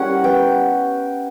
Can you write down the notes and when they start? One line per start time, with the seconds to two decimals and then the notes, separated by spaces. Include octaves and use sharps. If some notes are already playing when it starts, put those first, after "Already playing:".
Already playing: G3 C#4 E4 A#4 F#5
0.24 B3 G5